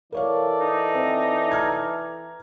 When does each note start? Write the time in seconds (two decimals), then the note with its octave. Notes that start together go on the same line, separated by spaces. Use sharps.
0.12 E3 A4 A#4 C#5 D5 F5
0.60 D#4
0.94 C4
1.51 A#5 F6 G#6